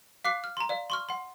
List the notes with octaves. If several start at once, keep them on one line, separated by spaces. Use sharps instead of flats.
F5 D6 F#6 B6 C7
F6
A#5 C6
D5 F5
C6 C#6 F6
F#5 C6